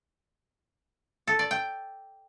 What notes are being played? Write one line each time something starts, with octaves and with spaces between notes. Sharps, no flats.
A4
D5
G5